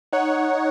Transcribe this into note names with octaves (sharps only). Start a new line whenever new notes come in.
D#4 C#5 F#5